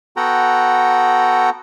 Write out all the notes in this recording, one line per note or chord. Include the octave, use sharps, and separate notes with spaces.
B3 F#4 A4 F#5 G5 A#5